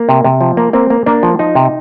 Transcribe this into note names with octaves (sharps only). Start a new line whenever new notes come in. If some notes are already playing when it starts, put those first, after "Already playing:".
Already playing: A#3
C3
C3
F3
A#3
A#3 C4
A#3
A#3 D4
F3
F3 D#4
C3